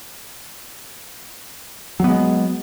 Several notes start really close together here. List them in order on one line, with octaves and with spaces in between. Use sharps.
F#3 B3 G#3